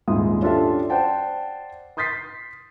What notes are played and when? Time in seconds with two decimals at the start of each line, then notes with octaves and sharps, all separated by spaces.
0.08 D#1 G#2 E4 F4 D#6
0.42 C#4 D4 F4 G4 A4 E5
0.90 C5 D5 F#5 G5 A5
1.97 C6 D#6 G6 A6 B6 C7